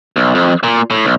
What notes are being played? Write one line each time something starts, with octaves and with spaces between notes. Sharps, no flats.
B1
F2
A#2
A2
B1